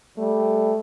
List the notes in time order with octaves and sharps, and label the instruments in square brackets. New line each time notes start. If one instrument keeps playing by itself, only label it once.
[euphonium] G3 [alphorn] A3